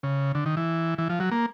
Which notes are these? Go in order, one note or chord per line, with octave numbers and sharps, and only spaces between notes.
C#3
D3
D#3
E3
E3
F3
F#3
A#3